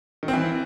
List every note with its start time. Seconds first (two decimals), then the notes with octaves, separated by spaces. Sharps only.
0.23 D#3
0.28 C4
0.33 E3